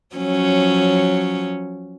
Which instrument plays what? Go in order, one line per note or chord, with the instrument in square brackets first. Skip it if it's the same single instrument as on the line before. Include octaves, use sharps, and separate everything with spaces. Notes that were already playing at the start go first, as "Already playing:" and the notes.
[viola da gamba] F3 F#3 C#4